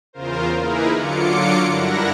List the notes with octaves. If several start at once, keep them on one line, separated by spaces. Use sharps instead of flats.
E2 C#3 F4 A#4 C5
A#3 D#4 E4 G#4 A#4 B4
D3 F#3 F4 D6 C#7
G2 D4 E4 A#4 F#5 A#6